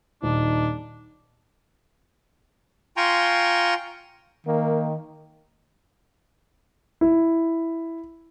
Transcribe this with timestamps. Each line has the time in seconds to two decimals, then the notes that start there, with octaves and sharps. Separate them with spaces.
0.23 D#1 D4 D#4
2.97 F4 G5 G#5 A#5 C6 C#6
4.46 D#3 A#3
7.01 E4